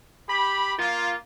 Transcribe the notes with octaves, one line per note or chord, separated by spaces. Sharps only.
G4 B5
A#3 F4